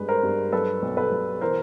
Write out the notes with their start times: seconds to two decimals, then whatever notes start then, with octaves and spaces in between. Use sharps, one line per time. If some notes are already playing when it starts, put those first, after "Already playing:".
Already playing: G2 G#3 B4
0.08 A#4 C5
0.23 G2
0.52 F#3 A4 B4
0.82 B1
0.97 A4 B4
1.12 B1
1.41 E3 A#4 C5